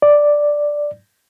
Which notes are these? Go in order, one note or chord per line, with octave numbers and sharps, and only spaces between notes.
D5